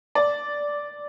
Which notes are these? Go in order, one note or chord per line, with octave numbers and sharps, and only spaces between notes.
D5